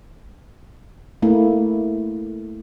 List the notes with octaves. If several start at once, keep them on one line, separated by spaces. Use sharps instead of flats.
A3 A#3 E4